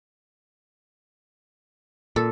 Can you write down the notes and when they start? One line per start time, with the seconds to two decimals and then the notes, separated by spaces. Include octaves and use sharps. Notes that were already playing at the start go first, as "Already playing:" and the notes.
2.16 A#2 A4